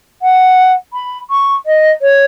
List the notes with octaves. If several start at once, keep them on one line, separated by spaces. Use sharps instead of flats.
F#5
B5
C#6
D#5
C#5